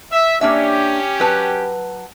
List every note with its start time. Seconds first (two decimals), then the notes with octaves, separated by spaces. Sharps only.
0.11 E5
0.41 A#3 C#4 D4 G4 E5
1.20 F#3 B4 A5